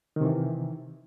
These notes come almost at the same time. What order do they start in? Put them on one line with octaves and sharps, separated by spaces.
D#3 C3 E3